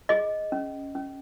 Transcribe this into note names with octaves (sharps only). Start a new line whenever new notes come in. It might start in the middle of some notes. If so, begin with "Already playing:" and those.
G#4 D#5
C#4
C#4